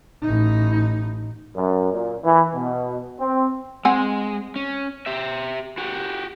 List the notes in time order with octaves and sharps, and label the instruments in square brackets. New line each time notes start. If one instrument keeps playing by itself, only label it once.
[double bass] A1 D#4
[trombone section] F#2
A#2
E3
B2
C4
[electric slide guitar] G#3 [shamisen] C4 F#5 G#5
[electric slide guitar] C#4
G4 E5
F#4 G4